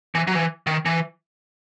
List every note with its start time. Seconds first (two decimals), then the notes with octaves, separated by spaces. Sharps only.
0.15 E3
0.27 F#3
0.35 E3
0.67 D#3
0.86 E3